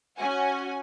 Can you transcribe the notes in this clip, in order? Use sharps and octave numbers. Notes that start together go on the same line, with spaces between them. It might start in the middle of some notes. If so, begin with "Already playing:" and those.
C#4 F#4 F#5 G#5